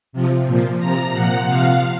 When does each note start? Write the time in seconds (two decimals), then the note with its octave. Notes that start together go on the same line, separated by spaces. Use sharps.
0.13 C3 F3
0.46 A#2 F3
0.79 C3 F3 A#5
1.12 A#2 F3 F#5
1.45 C3 F3 F5